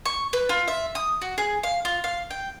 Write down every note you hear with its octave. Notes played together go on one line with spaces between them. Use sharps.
C#6
B4
F4
E5
D#6
F#4
G#4
F5
F4
F5
G5